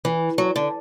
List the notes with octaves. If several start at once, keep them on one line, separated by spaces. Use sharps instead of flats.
E3
F#3
D3